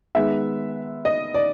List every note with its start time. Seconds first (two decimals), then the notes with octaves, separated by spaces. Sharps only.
0.15 D#3 G#3 B3 E5
1.05 D#5
1.34 D5